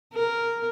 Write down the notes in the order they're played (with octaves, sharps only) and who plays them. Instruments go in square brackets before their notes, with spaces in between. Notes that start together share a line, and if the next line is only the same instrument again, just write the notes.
[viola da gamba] A#4